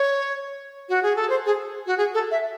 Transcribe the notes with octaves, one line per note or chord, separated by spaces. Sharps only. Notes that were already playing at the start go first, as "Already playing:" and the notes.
Already playing: C#5
F#4
G#4
A4
C5
G#4
F#4
G#4
A4
E5